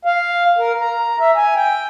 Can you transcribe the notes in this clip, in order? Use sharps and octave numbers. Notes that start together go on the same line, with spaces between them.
F5
A#4
A#5
E5
G#5
G5